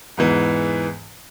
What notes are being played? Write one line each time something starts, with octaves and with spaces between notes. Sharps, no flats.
E2 G#2 E3